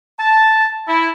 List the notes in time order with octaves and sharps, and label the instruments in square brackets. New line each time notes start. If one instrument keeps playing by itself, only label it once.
[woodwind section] A5
E4